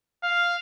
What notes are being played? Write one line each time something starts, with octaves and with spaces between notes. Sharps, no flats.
F5